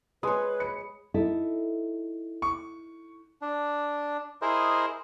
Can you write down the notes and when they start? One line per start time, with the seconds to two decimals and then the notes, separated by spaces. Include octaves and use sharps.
0.23 G#3 B4 C#5 G#5 C6 D#6
0.60 B5 C#7
1.14 D#4 E4 A4
2.42 C#6
3.42 D4
4.42 E4 G#4 A#4 C5 D#5